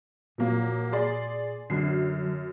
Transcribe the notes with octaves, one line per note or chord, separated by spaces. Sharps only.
A#2 F3 F#3 A#3
G#4 D5 C6
F#2 D3 F#3 C7